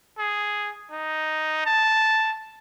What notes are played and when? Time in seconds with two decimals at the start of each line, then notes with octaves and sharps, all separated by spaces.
0.18 G#4
0.91 D#4
1.66 A5